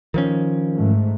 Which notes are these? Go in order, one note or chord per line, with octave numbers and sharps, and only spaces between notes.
D#3 F3 C#4
G#2 A3